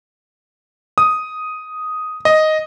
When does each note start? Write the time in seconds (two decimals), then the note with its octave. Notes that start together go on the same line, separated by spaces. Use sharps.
0.98 D#6
2.25 D#5